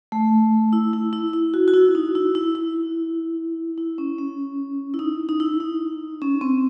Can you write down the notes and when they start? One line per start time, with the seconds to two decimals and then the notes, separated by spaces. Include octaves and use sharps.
0.12 A3
0.73 E4
0.93 E4
1.13 E4
1.33 E4
1.54 F#4
1.68 F#4
1.74 E4
1.89 E4
1.95 D#4
2.15 E4
2.35 E4
2.55 E4
3.78 E4
3.98 C#4
4.18 C#4
4.94 E4
4.99 D#4
5.29 D#4
5.40 E4
5.60 D#4
6.22 C#4
6.41 C4